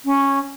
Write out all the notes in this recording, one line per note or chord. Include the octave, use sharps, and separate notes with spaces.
C#4